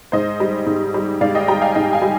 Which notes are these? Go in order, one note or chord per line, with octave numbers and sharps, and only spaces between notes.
G#2 C5 D#5
G3
G#2
G3
G#2 D5 F5
D#5 G5
G3 G5 A#5
F5 G#5
G#2 D#5 G5
F5 G#5
G3